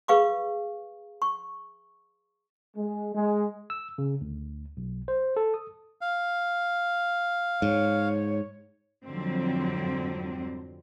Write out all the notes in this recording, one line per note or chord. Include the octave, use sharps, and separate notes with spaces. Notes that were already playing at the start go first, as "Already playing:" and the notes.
G#4 B4 F5 C#6 D6
C#6
G#3
G#3
E6
C#3
D2
B1
C5
A4
D#6
F5
G#2 C#5
F2 G#2 D3 F#3 G3 C4